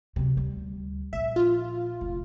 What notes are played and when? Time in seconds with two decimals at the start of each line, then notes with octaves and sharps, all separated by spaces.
0.16 C3 F#3
0.37 D2 G3
1.13 A#1 E5
1.36 F4
2.01 F1